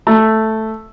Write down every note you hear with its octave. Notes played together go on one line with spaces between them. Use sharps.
A3